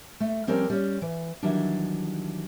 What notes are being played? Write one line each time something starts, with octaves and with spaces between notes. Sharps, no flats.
A3
F3 G3 C4 C#4 A#4 D5
G3 C#4
E3
D#3 E3 F#3 G3 D4